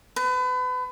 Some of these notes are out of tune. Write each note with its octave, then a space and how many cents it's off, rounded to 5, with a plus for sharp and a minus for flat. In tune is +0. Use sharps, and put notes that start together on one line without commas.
B4 +35